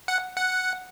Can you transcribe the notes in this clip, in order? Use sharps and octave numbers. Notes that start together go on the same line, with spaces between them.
F#5
F#5